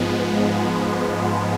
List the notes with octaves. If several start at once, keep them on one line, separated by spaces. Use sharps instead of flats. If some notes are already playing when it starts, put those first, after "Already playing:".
Already playing: G#2 F3 G#3 B3